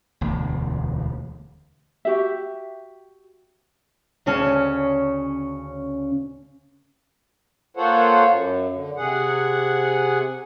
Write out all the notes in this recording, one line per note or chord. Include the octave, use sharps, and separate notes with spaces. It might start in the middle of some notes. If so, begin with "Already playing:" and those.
E1 D2
F#4 G4 E5
D2 C#3 C#4 A5
A#3 F4 A4 C5 C#5 F#5
F#2
D3
C3 G#4 F#5